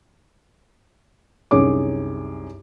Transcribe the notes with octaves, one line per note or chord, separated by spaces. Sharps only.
C2 F#2 D#4 G#4 C#5 D6